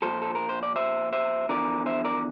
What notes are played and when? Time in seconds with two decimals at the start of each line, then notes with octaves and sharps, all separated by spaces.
0.02 A#2 F3 A4 C5
0.22 A4
0.35 A#4
0.49 C5
0.63 D5
0.76 C5 E5
1.13 C5 E5
1.49 E2 D3 F3 A#4 D5
1.86 C5 E5
2.05 A#4 D5